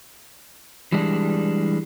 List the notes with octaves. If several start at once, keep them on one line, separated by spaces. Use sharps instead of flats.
E3 G3 G#3 D4